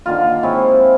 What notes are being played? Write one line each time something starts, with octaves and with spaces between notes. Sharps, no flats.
D3 D#3 A#3 F4
G#3 C4 E4 C#5